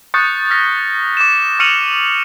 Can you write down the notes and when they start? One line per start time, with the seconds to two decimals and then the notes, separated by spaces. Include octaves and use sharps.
0.14 C#6 D#6 F#6 G6 A6 C#7
0.50 F6 A#6 B6
1.17 D6 E7
1.59 C#6 F6 C#7 D#7 F7 F#7